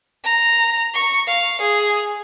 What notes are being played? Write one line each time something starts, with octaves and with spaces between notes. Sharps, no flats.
A#5
C#6
F5
G#4